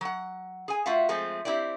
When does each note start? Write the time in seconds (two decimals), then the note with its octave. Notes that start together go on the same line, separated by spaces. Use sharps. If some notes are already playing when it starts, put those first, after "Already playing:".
0.01 F#3 F#5
0.68 G#4 G#5
0.86 A3 F4 F#4 E5 F5
1.09 F3 G#3 A3 C4
1.45 C4 E4 G4 D5